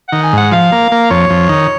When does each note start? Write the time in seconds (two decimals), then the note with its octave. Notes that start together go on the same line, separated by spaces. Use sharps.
0.08 D#3 F#5
0.23 G#5
0.33 G#2 F#5
0.51 F3 F5
0.72 A#3
0.92 A#3
1.10 F2 C#5
1.30 F2
1.49 D#3